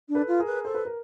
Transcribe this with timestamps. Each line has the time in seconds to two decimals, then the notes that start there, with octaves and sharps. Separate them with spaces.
0.08 D4
0.15 A4 B4
0.27 F4
0.40 G#4 A#4
0.46 B4
0.65 A4 C5
0.74 B4
0.85 A#4